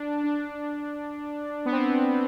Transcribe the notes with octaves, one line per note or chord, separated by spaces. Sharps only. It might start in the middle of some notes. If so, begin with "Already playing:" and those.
Already playing: D4
D4
B3
C4